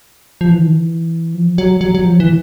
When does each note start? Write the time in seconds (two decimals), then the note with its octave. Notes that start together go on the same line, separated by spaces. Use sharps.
0.41 F3
0.50 E3
0.59 D#3
0.67 E3
1.35 F3
1.58 F#3
1.81 F#3
1.95 F#3
2.05 F3
2.20 E3